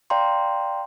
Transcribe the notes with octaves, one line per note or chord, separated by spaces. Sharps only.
D5 F5 G5 A#5 C6